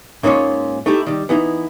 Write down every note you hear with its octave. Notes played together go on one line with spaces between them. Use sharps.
G#2 A#3 C#4 D#4 F4 C#5
A3 D#4 E4 G4
D#3 G3
E3 B3 D#4 E4